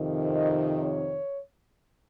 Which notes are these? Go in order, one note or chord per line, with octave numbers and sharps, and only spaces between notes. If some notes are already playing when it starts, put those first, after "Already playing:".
Already playing: F2 C3 D#3
D#5
C#5